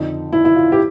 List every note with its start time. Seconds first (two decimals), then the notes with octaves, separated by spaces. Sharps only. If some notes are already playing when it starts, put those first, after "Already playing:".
Already playing: F2 D3 D#4
0.33 E4
0.45 E4
0.56 F4
0.72 G4